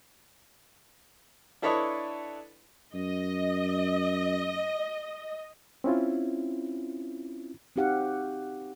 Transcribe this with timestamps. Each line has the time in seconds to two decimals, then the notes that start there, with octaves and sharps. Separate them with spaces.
1.62 D4 E4 A4 B4 C#5 D#5
2.94 F#2 D#5
5.84 C4 C#4 E4 F4
7.76 C4 D#4 F#4 G4 F5 F#5